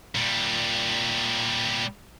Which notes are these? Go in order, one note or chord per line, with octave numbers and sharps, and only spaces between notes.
A#2 G3